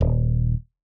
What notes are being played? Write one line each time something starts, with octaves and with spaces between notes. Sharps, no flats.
D#1